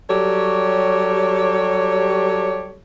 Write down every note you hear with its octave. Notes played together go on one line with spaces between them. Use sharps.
F#3 G3 G4 A4 C#5